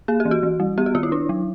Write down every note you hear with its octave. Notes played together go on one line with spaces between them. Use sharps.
A#3 G#4
G4
E3
F#4
E3
G3
B3 G4
F#4
D#3 F4
E4
D4
F#3